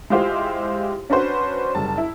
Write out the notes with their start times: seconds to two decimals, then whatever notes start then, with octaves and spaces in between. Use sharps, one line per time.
0.10 G#3 E4 F4 G4 C5 F5
1.10 C#4 D4 F#4 B4 C5
1.75 F#1 G3 A5
1.98 E4